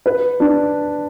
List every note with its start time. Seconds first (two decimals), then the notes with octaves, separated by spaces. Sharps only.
0.06 B4
0.40 D4